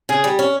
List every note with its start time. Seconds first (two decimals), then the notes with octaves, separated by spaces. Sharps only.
0.09 C#3 G#4
0.24 G3
0.39 C#4